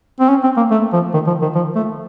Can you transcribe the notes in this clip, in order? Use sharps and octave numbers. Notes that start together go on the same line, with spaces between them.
C4
C#4
C4
A#3
A3
F3
D#3
F3
D#3
F3
A3